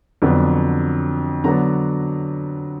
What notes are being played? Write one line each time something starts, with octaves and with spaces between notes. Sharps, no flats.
F2 D3 F#3 B3 D4
D3 F#3 B3 D4 A#5